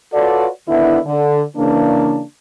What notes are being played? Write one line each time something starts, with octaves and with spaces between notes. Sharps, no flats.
F4 F#4 A4 B4 C#5 D5
D3 D#3 B3 D4 E4
D3
C#3 E3 A#3 D4